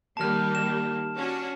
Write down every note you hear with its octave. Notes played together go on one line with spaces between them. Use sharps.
D#3 G3 A#3 A5 F6
E7
C#4 D4 F#4